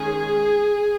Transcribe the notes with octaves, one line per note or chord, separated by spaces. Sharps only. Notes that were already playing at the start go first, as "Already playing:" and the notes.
Already playing: D#3 G#3 C#4 G#4